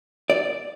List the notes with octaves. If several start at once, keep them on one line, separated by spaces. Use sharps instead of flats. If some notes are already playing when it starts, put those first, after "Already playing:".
D5